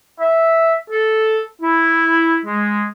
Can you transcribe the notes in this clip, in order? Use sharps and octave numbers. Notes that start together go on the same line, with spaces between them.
E5
A4
E4
G#3